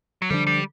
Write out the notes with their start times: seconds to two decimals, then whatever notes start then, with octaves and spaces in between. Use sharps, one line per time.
0.22 F#3
0.30 D3 F3 G3 A3 D4
0.47 G3